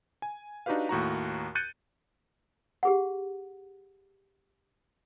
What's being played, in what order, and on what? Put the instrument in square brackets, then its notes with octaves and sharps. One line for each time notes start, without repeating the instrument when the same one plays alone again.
[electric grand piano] G#5
D4 D#4 F#4 G4 B4 F5
D#2 A2 F#4 A#5
F#6 G6 A6 C#7 D#7
[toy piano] G4 G#4 F#5